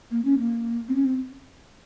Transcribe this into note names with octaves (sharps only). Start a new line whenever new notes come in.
A#3
C#4
A#3
C4
C#4
C4